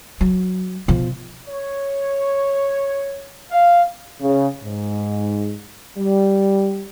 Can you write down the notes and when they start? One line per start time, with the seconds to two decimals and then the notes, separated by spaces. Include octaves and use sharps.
0.21 F#3
0.88 B2 F3
1.48 C#5
3.52 F5
4.21 C#3
4.64 G#2
5.97 G3